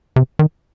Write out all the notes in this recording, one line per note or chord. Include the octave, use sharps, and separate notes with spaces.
C3
D#3